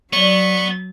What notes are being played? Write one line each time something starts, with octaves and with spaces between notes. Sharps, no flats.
F#3 B3 C#5 D5 C#6